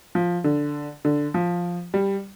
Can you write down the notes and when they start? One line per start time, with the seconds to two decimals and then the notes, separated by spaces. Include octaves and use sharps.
0.15 F3
0.44 D3
1.05 D3
1.34 F3
1.94 G3